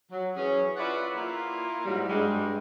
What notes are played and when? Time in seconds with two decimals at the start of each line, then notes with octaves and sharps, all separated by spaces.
0.12 F#3
0.36 E3 C#4 G#4
0.77 F4 B4 C#5 D5 E5 F#5
1.14 A#3 E4 F4
1.85 G#2 F#3 G3
2.10 G2 G3 G#3